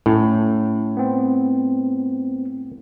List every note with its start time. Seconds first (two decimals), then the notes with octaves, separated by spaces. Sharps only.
0.06 A2 C#4
0.97 B3 C4